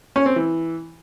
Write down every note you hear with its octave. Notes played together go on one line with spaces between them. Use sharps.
C#4
C4
E3